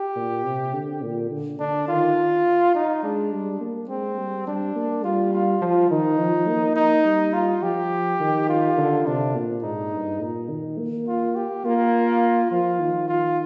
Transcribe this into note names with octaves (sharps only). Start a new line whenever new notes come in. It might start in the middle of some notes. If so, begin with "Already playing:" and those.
Already playing: G4
A#2
C3
D3
A#2
D3
D3 D4
D#3 F4
D#4
G#3 D4
G3
A#3
G#3 C4
G3
G3 D4
A#3
G3 F4
F4
F3
D#3 D#4
F3
A#3
D#4
G3
F4
F3 G4
D#3
F4
D3
C3 D4
A#2
G#2 D#4
G2
A#2
D#3
A#3
F4
G4
A#3 F4
F3 F4
D#3
F4